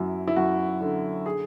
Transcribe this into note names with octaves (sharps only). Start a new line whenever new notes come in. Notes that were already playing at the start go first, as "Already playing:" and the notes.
Already playing: F#2 F#3 E4
E4
F#2 F#4
D3
G#4